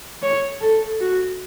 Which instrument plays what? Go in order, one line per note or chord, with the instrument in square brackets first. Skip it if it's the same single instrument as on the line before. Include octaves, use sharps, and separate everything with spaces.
[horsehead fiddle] C#5
A4
F#4